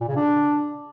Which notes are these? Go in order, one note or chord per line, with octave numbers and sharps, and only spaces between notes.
A#2
C#3
D4